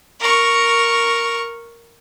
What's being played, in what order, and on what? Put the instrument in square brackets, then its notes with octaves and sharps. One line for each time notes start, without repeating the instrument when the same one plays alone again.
[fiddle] A#4 C#6